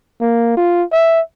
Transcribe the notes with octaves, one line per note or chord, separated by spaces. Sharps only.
A#3
F4
E5